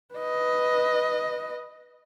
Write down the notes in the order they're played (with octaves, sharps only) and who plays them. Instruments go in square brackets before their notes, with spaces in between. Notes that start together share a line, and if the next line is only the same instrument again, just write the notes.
[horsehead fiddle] B4 D#5